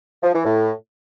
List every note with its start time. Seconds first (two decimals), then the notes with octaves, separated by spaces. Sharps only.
0.23 F3
0.34 E3
0.45 A2